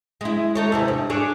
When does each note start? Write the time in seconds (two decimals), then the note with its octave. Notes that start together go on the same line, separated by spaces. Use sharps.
0.21 G#3 E4
0.55 D#4 A4 C#5
0.72 E2 C3 E3
0.88 G2
1.10 D4 G#4 C#5